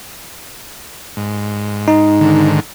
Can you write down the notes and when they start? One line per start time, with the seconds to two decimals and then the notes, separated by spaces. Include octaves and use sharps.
1.17 G#2
1.88 D#4
2.21 G#2 D3 D#3